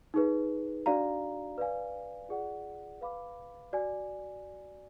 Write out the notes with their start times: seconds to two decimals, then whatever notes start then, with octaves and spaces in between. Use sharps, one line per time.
0.14 D#4 G#4 B4
0.86 D4 F#4 D5 F5 A#5
1.58 B4 D5 F5 G#5
2.29 F4 G#4 D5 F#5
3.01 B4 F5 B5 D6
3.73 F#4 D5 G#5